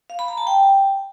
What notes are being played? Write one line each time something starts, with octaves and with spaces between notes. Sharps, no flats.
F5
B5
A#5
A5
G5